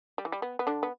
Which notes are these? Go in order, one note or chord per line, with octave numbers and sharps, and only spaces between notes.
G3
E3
G3
B3
B3
D3 D4
B3